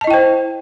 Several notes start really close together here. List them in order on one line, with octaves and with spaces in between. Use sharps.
A5 D#5 E4 G5 C5